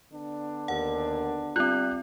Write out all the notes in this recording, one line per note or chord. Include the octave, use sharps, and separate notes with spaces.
D3 B3 D4
D#2 F#5
G3 C4 F4 F#6